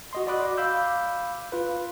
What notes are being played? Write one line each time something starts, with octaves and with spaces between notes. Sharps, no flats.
F#4 D#5 C6
F#4 D5 D#5 B5 D6 F#6
F5 B5 D6 E6 G6
F4 B4